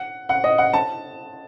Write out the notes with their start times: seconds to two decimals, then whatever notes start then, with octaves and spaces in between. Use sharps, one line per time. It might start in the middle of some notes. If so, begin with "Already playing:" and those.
Already playing: F#5
0.29 F#5
0.44 D#5
0.58 F#5
0.73 A5